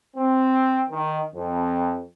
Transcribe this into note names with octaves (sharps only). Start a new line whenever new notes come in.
C4
D#3
F2